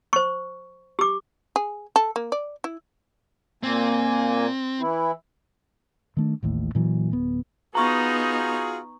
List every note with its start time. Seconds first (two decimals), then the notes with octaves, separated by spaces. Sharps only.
0.13 C5 C#6
0.99 G4 D6
1.56 G#4
1.96 A4
2.16 A#3
2.32 D5
2.64 E4
3.63 A#2 A#3 C4 G#5
4.80 E3 E4
6.17 D#3 A3 D4
6.43 A1 D#2 A2
6.75 A#2 E3 F#3
7.12 D1 B3
7.75 B3 D#4 F4 F#4 G#4 A#5 C#6